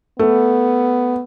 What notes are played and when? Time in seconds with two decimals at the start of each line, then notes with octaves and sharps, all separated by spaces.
0.19 A3 B3